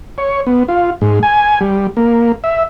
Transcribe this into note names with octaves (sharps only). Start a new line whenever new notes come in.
C#5
B3
F4
G#2
G#5
G3
A#3
E5